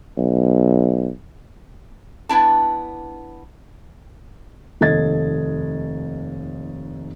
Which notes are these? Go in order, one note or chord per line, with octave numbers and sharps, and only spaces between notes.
B1
B3 D4 E4 A5
F1 D#2 A4 D#5 G#6 A6